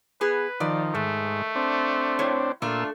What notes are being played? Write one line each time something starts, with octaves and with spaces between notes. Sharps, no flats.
B3 G#4 B4
D#3 F3 D5
G#2 D#3 A3
C4 D4
A2 C5 C#5
A#2 A3 D4 F4 A4 E6